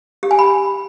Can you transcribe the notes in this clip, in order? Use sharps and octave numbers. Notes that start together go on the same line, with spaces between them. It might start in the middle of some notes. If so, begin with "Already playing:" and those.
G4
G#5
B5